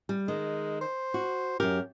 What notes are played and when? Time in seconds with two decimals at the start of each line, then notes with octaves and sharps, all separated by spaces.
0.09 G3
0.28 D#3 G#3
0.81 C5
1.14 F#4
1.60 F#2 G4 A#4